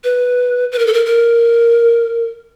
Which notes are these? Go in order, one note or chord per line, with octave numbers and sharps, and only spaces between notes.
B4
B4
A#4
A4
A#4
A#4